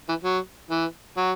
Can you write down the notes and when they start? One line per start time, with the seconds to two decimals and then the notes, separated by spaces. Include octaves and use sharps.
0.08 E3
0.23 F#3
0.70 E3
1.17 F#3